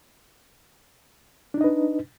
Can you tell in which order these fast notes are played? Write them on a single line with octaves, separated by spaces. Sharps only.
D4 D#4 D#5 B4